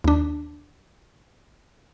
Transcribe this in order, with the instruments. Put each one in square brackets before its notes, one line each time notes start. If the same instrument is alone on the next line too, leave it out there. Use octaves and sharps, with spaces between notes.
[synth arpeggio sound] D#2 D4